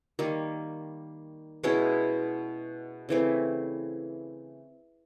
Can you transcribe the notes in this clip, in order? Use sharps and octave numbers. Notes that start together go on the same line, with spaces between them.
D#3 G3 A#3
B2 G#3 C#4 E4
C#3 E3 A3 C4